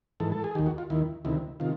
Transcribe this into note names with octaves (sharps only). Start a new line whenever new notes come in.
G#2 E3 A4
A4
G#4
D#2 D#3 G4
F#4
F4
D#2 D#3 E4
D2 C3 D#3 E4
C3 D#3 F4